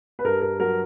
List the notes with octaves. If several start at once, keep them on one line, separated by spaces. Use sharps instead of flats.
B4
G2 A#4
A#4
F#3 A#4